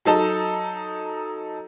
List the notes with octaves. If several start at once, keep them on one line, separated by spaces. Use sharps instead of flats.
F#3 D#4 A4